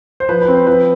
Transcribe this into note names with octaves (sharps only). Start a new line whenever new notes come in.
C5
F3 B4
B4
C4
C5
F3 B4